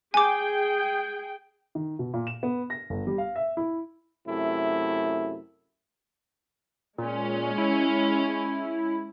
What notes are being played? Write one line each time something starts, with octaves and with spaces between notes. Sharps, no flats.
G#4 G5 G#5 D6
D#3
B2
A#2
E7
B3
A#6
G1
G3
F5
E5
E4
F#2 C3 A3 E4
A#2 G#3 C#4
E4